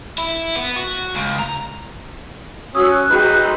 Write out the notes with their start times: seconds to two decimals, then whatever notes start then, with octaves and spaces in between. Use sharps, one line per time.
0.18 E4
0.56 B3
0.76 F#4
1.16 C#2
1.39 A#5
2.75 C#4 F#4 D#6 E6
2.91 F#6
3.11 D#4 F#4 G#4 B4 G5
3.23 G4 A#5
3.41 C6 E6